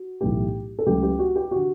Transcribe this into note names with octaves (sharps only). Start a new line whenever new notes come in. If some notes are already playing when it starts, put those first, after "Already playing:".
Already playing: F#4
B1 A2 E3 A3 G4
A4
C#2 C#3 F#3 A3 G4
G4
F#4
G4
D3 F#4